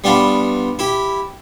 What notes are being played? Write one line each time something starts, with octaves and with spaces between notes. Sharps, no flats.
G3 B3 D4 F4
E4 G4